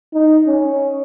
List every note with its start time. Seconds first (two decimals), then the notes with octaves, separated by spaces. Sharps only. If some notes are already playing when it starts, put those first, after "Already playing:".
0.14 D#4
0.47 C#4